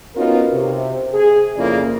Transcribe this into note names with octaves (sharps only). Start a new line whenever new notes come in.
B3 C#4 D#4 F4 F#4 A#4
C3
G#4
F2 C#3 A#3 E4 F4 D5